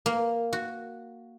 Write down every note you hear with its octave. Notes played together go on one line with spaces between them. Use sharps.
A#3
F#4